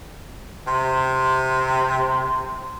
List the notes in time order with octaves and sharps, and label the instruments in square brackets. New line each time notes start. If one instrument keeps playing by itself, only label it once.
[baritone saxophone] C3 [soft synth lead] C6